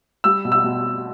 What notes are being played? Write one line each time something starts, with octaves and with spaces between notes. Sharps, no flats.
G3 E6
B2
E6
B2